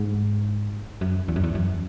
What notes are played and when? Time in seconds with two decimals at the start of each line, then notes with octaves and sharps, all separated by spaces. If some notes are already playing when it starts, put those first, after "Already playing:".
Already playing: G#2
1.01 F#2
1.28 E2
1.36 F#2
1.44 E2
1.55 F#2